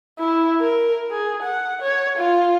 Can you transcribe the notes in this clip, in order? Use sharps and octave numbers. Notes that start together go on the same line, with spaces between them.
E4
A#4
G#4
F#5
C#5
F4